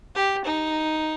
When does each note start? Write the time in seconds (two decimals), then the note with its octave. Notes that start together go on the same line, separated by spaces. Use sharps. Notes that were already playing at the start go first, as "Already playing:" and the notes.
0.15 G4
0.44 D#4